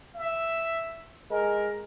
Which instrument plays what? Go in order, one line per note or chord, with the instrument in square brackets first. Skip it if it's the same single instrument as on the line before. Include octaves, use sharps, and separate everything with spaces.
[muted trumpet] E5
[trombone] G#3 [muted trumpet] A#4